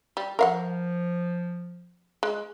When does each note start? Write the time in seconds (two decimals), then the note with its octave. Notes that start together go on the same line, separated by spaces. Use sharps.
0.17 G3
0.39 F3 A#4 F5 F#5
2.23 G#3